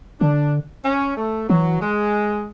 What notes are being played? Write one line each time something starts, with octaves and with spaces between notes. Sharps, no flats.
D3 D4
C#4
A3
E3 F#3
G#3